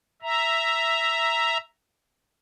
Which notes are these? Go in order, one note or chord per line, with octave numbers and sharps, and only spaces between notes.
E5 A#5